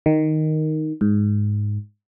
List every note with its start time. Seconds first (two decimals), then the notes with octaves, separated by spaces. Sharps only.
0.06 D#3
1.01 G#2